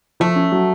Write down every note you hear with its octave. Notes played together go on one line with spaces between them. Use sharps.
F3 A3
C#4
F#3